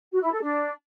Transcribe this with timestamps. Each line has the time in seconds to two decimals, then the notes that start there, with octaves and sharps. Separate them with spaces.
0.12 F#4
0.22 E4
0.31 A4
0.41 D4